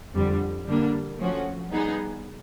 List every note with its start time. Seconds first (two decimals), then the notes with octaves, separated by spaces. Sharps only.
0.15 F2 D3 G3
0.67 D3 G3 A#3 D4
1.19 F3 A3 C#4 F#4
1.71 G3 B3 D#4 G#4